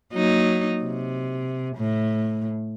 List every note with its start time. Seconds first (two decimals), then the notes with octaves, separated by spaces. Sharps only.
0.14 F#3 A#3 D#4
0.81 C3
1.76 A2